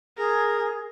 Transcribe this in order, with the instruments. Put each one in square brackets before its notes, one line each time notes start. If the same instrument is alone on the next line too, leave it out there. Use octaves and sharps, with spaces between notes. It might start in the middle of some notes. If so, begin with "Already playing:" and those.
[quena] G#4 [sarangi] A#4